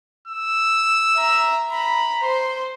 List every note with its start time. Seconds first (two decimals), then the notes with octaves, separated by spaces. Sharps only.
0.28 E6
1.16 E5 A#5
1.71 A#5 B5
2.23 C5 C6